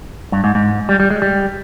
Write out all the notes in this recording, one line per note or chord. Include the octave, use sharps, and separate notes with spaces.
G2
G#2
G#2
G3
G3
G#3
G3